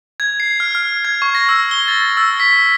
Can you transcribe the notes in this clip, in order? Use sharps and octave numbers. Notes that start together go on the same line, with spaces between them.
G#6
C7
F6
F6
G#6
C#6
A#6
E6
G7
A6
E6
B6